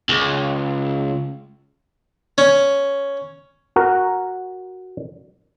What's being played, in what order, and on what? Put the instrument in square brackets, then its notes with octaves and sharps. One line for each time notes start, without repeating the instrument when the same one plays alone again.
[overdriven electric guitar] C#2
[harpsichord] C#4
[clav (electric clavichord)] F#4 A#4